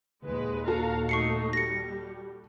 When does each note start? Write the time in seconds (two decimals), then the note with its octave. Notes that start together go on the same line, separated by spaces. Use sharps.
0.24 D#2 A#2 G#3 B4
0.68 F#4 A4 F5 A#5
1.09 A3 D#4 C#6 C7 C#7
1.53 G3 A#6 C#7